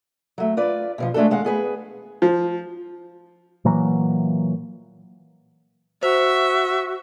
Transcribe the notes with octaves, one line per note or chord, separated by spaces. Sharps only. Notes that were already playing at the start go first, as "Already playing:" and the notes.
F#3 A3
F4 B4 D5
B2 E3 F3
G#3 A3 D4 F#4 A4
D#2 G#3 F5 F#5
B3 G#4 B4
F3
A#2 E3 F#3 A#3
F#4 C5 E5